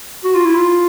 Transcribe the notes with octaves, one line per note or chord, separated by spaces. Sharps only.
F#4
F4
E4
F4